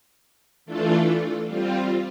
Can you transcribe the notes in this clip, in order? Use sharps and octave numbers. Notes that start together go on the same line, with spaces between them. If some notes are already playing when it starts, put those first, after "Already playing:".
E3 A3 D4 F4 A4
G3 C4 F4